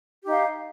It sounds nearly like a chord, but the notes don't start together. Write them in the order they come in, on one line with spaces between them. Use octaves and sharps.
G4 D#4 F5